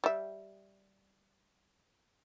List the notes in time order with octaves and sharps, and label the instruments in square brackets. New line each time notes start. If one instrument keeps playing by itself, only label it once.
[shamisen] G3 E5